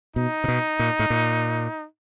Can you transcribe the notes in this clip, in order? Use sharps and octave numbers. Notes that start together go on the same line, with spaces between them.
B2 D#4
C3
B2
A#2
A2
A#2